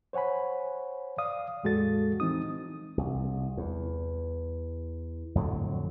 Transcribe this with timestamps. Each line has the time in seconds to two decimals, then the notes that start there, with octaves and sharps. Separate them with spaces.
0.13 C5 C#5 F#5 G#5 B5
1.18 D5 F5 D#6
1.63 E2 A2 G#3 F#4 A4 A6
2.20 E3 C4 D#4 D#6
2.97 C2
3.57 E2
5.35 F2 A2 D3 F#3